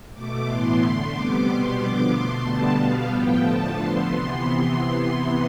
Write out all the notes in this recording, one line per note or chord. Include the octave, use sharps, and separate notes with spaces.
B2 A3 D6
A2 E3 B3 C6
D3 A3
C3 G3 B3 D6
B2 G3 B3 C6
D3 F3 B3 D6
B2 A3 C6
D3 G3 B3 A5
B2 G3 B3 F5
A2 F3 B3 G5
D3 F3 A3 A5
D3 F3 B3 C6
C3 E3 B3